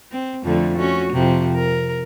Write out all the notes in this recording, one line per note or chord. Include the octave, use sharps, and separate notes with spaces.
C4
F2 D3 A3
C#4 F#4
F2 C3
A#4